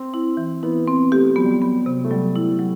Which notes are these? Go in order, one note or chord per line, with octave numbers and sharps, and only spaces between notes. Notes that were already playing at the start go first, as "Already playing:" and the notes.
Already playing: C4
E4
E3
B3 E4
B3 C4
A3 G4
F#3 B3
G3
F#3
B3
C3
A3
F#3 G3
E4
F#3